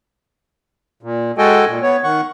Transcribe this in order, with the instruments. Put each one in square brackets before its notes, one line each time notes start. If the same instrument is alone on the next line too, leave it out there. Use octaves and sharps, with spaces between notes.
[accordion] A#2
G#3 F#4 A4 D#5 G5 G#5
A#2
B3 C#5
D#3 F#5 C#6